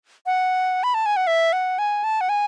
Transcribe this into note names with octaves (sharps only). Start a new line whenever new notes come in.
F#5
B5
A5
G#5
F#5
E5
F#5
G#5
A5
F#5
G#5